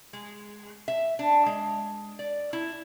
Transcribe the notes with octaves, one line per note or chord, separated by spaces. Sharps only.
G#3
E5
D4
G#3
D5
E4